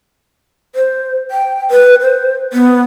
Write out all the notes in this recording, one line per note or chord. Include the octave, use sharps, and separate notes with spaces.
C5
G5
B4
C5
B3